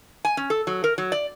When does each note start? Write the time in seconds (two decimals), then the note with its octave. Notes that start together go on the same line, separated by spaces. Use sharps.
0.25 G#5
0.37 C#4
0.50 A4
0.67 F#3
0.84 A#4
0.98 F#3
1.12 D5